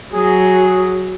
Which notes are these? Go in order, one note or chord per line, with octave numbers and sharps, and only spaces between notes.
F#3 G#4